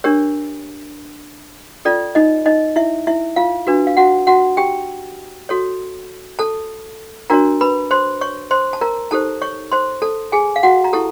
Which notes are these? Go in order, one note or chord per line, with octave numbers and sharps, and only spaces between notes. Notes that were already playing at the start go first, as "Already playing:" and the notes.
D4 G4 A#4 C#5
C#4 F4 A4 D5
D#4 D#5
D#4 D#5
E4 E5
E4 E5
F4 F5
D4 F#4 B4
F5
F#4 F#5
F#4 F#5
G4 G5
F#4 A4 C#5
A4 A5
D4 F#4 A#4 C#5 A#5
B4 B5
C5 C6
C#5 C#6
C5 C6
A5
A#4 A#5
D#4 G4 A4 C5 A5
C#5 C#6
C5 C6
A4 A5
G#4 G#5
F5
F#4 F#5
A#5
E4 G4 A4 A5